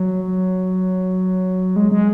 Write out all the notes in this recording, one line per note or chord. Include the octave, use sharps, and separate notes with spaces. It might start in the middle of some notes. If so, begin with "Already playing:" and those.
Already playing: F#3
G#3
G#3